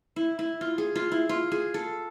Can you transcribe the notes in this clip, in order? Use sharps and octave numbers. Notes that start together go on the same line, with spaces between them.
E4
E4
F4
G#4
F4
E4
F4
G#4
A4